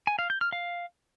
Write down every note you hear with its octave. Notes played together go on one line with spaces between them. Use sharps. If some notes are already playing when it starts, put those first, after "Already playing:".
G#5
F5
G6
F6
F5